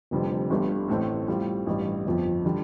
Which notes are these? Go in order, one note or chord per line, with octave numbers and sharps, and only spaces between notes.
F1 F2 D3 G3 C4
G1 G2 D3 G3
A1 A2 A3 C4 A4
A2 G3 C4 F4
A1 G2 G3
G1 F2 F3
D3 G3